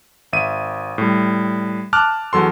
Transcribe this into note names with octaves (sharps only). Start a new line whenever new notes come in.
G#1 E5 D#7
A2 G3
A5 D6 F6 F#6
E2 F#3 A4 C6